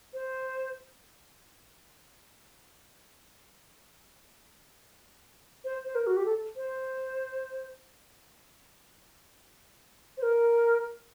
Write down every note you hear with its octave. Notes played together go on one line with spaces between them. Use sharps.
C5
C5
C5
A#4
F#4
G4
A4
C5
C5
A#4